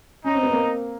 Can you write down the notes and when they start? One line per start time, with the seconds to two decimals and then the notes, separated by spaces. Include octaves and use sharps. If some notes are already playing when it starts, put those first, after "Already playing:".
0.24 C#4 D#4
0.34 C4
0.43 B3
0.51 A#3 C4